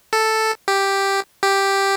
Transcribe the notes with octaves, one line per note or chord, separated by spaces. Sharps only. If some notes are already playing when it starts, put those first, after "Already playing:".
A4
G4
G4